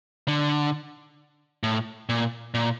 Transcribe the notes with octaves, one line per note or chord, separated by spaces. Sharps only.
D3
A2
A#2
A#2